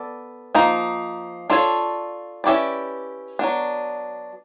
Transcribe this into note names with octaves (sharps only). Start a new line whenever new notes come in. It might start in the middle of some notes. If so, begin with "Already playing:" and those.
Already playing: B3 A4 D5
F3 A#3 D#4
D4 F4 A4 C#5
C#4 E4 G4 B4 D5
F#3 B3 D4